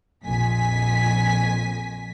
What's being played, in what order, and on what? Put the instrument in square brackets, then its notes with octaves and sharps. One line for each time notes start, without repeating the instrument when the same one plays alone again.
[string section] A#1 F2 G#5 B6